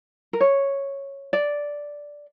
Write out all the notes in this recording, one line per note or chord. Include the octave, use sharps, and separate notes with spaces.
A#4
C#5
D5